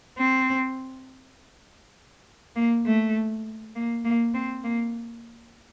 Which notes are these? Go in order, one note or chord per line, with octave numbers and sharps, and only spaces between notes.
C4
A#3
A3
A#3
A#3
C4
A#3